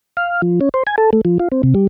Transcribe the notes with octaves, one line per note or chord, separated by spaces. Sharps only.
F5
F3
C#4
C5
G#5
A4
A3
F3
F4
C4
C3
G3